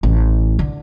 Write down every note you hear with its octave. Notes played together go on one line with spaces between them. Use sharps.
A1
D3